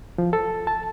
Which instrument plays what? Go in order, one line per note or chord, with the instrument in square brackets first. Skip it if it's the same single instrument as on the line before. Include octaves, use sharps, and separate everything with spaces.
[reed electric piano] F3
A4
A5